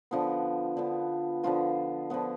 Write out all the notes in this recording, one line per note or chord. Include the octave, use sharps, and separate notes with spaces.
D3 F3 B3
D3 F3 B3
D3 F3 B3 F4
D3 F3 B3